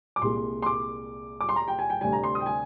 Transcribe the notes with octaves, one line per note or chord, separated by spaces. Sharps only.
D6
C2 A#2 G#3 C6
C6
D6
D6
C6
A#5
G5
G#5
G5
D2 C3 G3 G#5
A#5
C6
D#6
G5
G#5